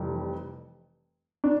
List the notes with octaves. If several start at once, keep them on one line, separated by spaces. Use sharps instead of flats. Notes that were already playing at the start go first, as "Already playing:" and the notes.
Already playing: F1 F2 E3 G3
D4